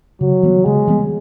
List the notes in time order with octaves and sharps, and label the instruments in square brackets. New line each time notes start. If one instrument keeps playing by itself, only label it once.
[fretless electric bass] C#3 [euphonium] F#3
[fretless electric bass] E3 G3 B3
[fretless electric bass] C#3 [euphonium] G#3
[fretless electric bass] E3 G3 B3